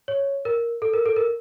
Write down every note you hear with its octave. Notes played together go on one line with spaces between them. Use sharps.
C#5
A#4
A4
A#4
A4
A#4